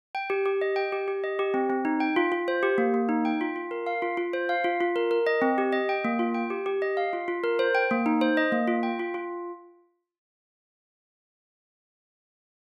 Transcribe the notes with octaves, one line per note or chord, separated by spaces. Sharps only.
G5
G4
G4
D#5
G5
G4
G4
D#5
G4
C4
C4
D#4
G5
F4
F4
C5
G4
A#3
A#3
D#4
G5
F4
F4
A#4
F5
F4
F4
C5
F5
F4
F4
A#4
A#4
D#5
C4
G4
D#5
G5
A#3
F4
G5
G4
G4
D#5
F5
F4
F4
A#4
C5
G5
A#3
D#4
C5
D#5
A#3
F4
G5
F4
F4